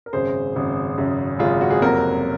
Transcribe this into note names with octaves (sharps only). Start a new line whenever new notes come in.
A#4
G#1 F#2 C#3 G#4 C5
G#1 F#2 C#3
G#1 F#2 C#3
G#1 F#2 C#3 F4 G#4
F#4
G#4
F2 C3 F#3 A#3 F#4 A#4